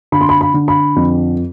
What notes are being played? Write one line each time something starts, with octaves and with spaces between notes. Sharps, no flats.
D3 B5
C6
B5
B5
D3
B5
F2